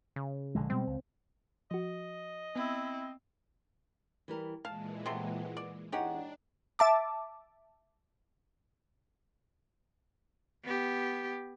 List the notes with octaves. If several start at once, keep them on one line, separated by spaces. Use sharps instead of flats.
C#3
A#1 D3 G#3
B2 G3 G#3 C4
C#2
F3 F#4 D#5
B3 C4 E4
E3 G3 A#4
A#2 E3 G#3 F5 A5
C3 A3 B3 C6
D5
E2 D4 D#4 G4 G#4 C#5 F#5
E5 A5 D6
B3 G4